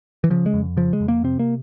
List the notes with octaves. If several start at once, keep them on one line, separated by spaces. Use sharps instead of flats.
E3
C#3 F3
G#3
F2
C#3 F3
G#3
F2
A#3
C3 C4
A#3